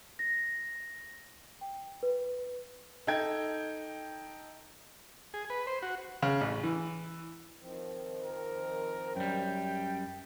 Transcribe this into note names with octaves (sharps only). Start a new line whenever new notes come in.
A#6
G5
B4
D#4 A4 G5 G#6
G#4
B4
C5
F#4
C#3
A1
E3
D#3 F3 C4
A#4
F#2 G3 G5